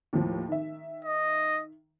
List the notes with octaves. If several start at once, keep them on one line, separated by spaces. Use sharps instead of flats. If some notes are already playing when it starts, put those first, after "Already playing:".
D#2 A2 F3
D#3 E5
D#5